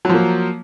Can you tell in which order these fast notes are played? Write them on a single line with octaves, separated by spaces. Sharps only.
F#3 F3 A#3